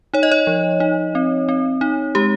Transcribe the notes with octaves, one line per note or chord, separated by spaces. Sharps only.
D#4 C#5
D#5
C#5
F3
D#4
C4
C4
D#4
G#3 G4